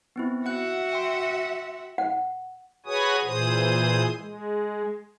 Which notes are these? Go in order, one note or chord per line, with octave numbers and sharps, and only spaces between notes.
B3 C4 E4
F#4 E5 F#5 F#6
G5 C6
F#5
F#4 G#4 B4 C#5 G#5 D#6
A#2 E3 G#4 C5 D#6
G#3